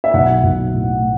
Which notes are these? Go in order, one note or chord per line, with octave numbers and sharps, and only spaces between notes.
E5
B1 F#5
B1
A2
A2